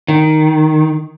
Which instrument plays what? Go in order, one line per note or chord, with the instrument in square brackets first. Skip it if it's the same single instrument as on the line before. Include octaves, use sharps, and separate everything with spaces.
[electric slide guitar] D#3